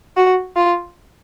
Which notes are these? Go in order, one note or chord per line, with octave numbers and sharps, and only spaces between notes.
F#4
F4